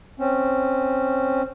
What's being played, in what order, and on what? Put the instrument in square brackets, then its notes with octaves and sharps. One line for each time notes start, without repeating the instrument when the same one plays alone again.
[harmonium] C4 C#4